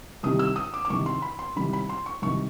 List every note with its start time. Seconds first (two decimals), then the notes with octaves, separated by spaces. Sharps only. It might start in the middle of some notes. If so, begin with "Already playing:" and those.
0.23 C2 C3 D#3 G3 D#6
0.39 E6
0.56 D#6
0.74 D6
0.85 D6
0.90 C2 C3 D#3 G3 C#6
1.06 C6
1.22 B5
1.39 C6
1.56 C2 C3 D#3 G3 B5
1.73 B5
1.89 C6
2.06 C#6
2.22 C2 C3 D#3 G3 C#6